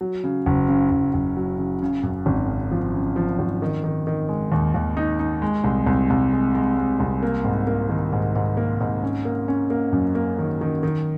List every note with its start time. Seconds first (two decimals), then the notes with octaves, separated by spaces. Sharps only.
0.01 F#3
0.24 C#3
0.46 F#1
0.69 C#3
0.91 F#1
1.14 F#1
1.37 F#3
1.58 C#3
1.82 C#3
2.03 F#2
2.26 G#1
2.48 C#3
2.71 F3
2.94 C#3
3.16 F3
3.39 G#1
3.62 D#3
3.84 D#3
4.07 D#3
4.29 G#3
4.52 D#2
4.74 D#2
4.97 D#4
5.19 D#4
5.42 G#3
5.64 C2
5.86 C2
6.10 C2
6.33 G#3
6.55 G#3
6.78 G#3
7.00 C2
7.23 A#3
7.45 G#2
7.67 A#3
7.90 D#3
8.12 G#2
8.35 G#2
8.57 A#3
8.80 G#2
9.03 C#4
9.25 A#3
9.48 C#4
9.70 A#3
9.92 F#2
10.15 A#3
10.38 D#3
10.61 D#3
10.83 D#3